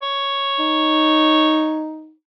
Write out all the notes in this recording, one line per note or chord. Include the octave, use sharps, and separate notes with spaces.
C#5
D#4